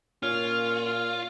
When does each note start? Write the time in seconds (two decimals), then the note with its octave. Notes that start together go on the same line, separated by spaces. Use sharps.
0.23 A#2 C#4 F4 F6